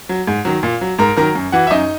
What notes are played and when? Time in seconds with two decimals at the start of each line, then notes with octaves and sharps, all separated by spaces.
0.09 F#3
0.27 G#2
0.45 D#3 F#3
0.63 A#2
0.81 F#3
0.99 G#2 A#4 A#5
1.17 D#3 F#3 A#4 A#5
1.35 F#2
1.52 E3 F#4 F#5
1.67 E5
1.71 F#2 D#4 D#5